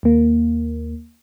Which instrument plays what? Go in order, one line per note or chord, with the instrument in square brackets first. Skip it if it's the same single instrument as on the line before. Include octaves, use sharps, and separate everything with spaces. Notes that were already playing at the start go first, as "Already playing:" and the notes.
[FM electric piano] D#2 A#3